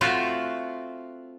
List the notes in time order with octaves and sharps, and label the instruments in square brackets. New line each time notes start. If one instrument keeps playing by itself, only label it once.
[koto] A3 C4 F4 F#4 E5